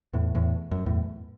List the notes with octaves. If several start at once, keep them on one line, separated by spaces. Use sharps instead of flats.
E2 A2
E2 A2
F#2
E2 A2